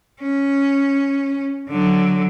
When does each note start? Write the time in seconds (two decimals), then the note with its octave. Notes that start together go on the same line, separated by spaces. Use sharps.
0.21 C#4
1.69 D3 F#3